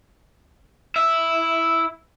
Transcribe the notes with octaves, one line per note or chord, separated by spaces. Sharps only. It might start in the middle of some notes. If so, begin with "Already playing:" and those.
E4 E5